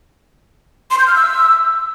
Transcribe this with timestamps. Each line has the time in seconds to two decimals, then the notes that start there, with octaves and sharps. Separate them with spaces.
0.91 C6
0.99 G6
1.07 F6
1.15 E6